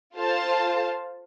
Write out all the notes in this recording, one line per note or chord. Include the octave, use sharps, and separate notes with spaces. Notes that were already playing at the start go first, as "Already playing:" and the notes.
F4 A4 C5 F5 A5